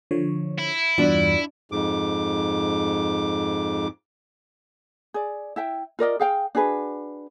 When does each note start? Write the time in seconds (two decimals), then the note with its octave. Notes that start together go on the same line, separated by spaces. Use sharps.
0.11 D3 F3 C#5
0.58 E4
0.98 E2 G2 D4 F4 F#4 B5
1.72 F2 G#2 D6
5.14 G#4 D5
5.56 E4 E5 G5
5.99 F4 A#4 D5 D#5
6.19 G#4 F5 G5
6.55 D4 F#4 G#4 B4